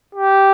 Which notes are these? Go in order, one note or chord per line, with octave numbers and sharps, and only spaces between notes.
G4